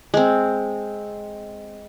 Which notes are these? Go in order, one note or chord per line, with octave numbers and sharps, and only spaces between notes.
G#3 C4